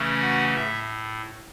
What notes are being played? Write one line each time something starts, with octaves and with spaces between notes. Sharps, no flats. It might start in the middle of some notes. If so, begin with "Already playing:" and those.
Already playing: C#3 E3 A3 C#4
F#4 F#5
A2 E5